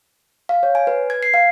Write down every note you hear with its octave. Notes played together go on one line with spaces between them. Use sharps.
F5
C#5
G#5
B4
G#6
C7
F5